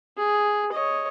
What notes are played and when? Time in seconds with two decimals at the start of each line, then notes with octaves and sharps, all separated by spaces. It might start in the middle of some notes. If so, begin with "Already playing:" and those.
0.18 G#4
0.72 C#5 D#5